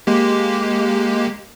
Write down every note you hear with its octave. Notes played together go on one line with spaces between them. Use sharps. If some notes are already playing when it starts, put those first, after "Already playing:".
G#3 A#3 G4